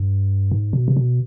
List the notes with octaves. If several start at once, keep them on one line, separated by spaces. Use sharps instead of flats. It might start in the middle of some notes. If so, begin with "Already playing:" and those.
Already playing: G2
G#2
B2
C3
B2